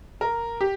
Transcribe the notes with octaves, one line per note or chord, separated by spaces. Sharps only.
A#4
G4